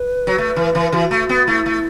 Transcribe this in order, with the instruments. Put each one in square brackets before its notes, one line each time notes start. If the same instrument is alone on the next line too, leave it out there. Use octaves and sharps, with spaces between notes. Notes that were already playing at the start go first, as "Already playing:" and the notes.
Already playing: [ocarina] B4
[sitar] F#3
A3
E3
E3
[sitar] E3 [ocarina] F#4
[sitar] A3
B3
[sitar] A3 [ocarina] E4
[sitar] A3